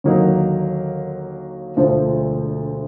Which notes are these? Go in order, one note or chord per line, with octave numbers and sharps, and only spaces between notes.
D#2 D3 F#3 A#3 D#4
E1 D2 D3 F3 A3